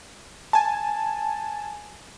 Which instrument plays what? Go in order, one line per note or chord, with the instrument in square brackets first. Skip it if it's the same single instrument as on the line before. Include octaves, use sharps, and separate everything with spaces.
[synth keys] G#5 A5